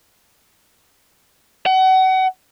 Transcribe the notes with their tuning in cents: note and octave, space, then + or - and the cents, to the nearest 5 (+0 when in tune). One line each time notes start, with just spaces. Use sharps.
F#5 +30